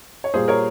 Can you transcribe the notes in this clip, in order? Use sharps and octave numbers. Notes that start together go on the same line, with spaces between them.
C#5
A#2 G3 A#3 G#4 C5
A#4 C#5